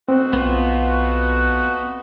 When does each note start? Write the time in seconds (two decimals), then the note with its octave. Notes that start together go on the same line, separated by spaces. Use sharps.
0.09 A3 C4 D#4 F#4
0.33 B1 B3 F4